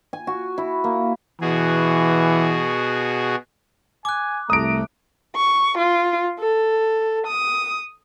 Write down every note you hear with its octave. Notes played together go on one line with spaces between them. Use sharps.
G#5
F#4
E4
A#3
B2 E3 F#4 G#4
G#5 D6 F#6
C2 A3 A#5 D#6 D7
C#6
F4
A4
D#6